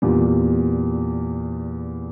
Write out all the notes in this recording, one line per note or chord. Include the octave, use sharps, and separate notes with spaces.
E2 A#2 G3